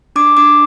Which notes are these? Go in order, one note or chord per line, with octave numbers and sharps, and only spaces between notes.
D4 D6
D4 D6